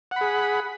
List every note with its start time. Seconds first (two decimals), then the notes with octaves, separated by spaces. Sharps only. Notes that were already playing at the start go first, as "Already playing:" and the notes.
0.11 F#5
0.16 B5
0.21 G#4